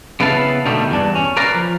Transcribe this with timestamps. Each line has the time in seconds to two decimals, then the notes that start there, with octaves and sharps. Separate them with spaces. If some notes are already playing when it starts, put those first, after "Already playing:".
0.20 C#3 B3 E4 B4 F5 A5
0.65 B2 D3 D#3 G3 A3 A#3
0.90 E2 G2 D4
1.15 C#4
1.37 A#4 B4 D5 F5 A#5
1.54 F3